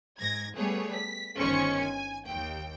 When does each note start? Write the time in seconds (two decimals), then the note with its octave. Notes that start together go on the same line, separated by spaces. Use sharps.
0.18 G#2 G#6 A#6
0.56 G3 A3 B3 G#4 C#5
0.93 B6
1.38 G1 D#3 C#4 C5 C#6 C#7
1.79 G#5
2.28 D#2 G5